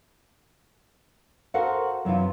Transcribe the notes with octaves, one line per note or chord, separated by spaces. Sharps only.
F#4 A4 A#4 C5 F5 F#5
F#2 C3 E3 F4